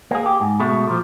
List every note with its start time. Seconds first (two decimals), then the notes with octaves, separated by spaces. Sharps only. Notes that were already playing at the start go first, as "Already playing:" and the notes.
0.11 A#3 G#4
0.26 G4
0.40 G#2
0.60 B2 G#3 A3
0.88 A#2 F3